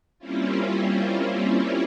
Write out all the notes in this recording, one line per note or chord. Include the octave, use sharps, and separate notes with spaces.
G3 A#3 C4 C#4 E4 F4